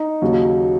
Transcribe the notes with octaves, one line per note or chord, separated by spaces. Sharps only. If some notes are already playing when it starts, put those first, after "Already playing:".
Already playing: D#4
D#2 C#3 F#3